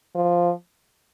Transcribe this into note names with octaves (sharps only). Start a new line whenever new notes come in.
F3